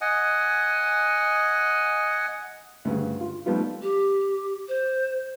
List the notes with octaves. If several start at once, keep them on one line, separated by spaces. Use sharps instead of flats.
D#5 F#5 G#5
D2 G2 C#3
F4
F3 G3 A3 B3 D#4 F4
G4
C5